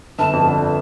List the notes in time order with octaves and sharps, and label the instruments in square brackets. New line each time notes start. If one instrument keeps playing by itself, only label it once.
[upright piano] G1 [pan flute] A5
[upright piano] F2
D3